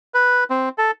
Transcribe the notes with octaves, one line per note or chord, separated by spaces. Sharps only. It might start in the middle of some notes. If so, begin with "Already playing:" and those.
B4
C4
A4